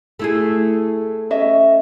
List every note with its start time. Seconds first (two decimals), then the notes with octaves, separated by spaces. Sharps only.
0.19 A3 E4 G#4
1.30 C#4 D#5 E5